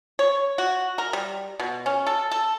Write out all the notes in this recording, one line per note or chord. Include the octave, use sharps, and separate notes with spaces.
C#5
F#4
A#4
G3
B2
C#4
A4
A4